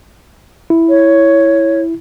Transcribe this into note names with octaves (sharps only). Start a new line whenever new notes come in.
E4
C#5